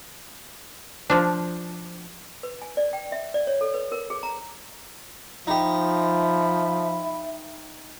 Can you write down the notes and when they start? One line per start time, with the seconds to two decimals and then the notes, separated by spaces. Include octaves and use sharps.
1.10 F3 D4
2.43 B4
2.62 G#5
2.77 D5
2.93 G5
3.12 E5
3.34 D5
3.47 C#5
3.61 A4
3.74 B4
3.92 A#4
4.10 G#4
4.23 A#5
5.47 F3 D#4 G4 E5 B5